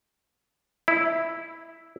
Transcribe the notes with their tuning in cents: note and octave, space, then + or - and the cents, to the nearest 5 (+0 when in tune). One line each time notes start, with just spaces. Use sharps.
E4 -5